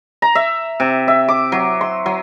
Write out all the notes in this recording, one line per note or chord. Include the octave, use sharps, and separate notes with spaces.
A#5
E5
C3
E5
D6
F#3
C6
F#3